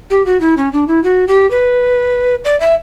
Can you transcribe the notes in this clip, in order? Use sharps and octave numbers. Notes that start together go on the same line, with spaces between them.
G4
F#4
E4
C#4
D4
E4
F#4
G4
B4
D5
E5